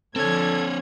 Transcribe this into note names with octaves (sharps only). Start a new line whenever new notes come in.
D3 F3 C4 A4 C#5 G#6